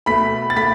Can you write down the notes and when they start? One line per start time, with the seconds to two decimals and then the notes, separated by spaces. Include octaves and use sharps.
0.06 B2 A3 B5 B6
0.50 A6
0.56 A3 B5 B6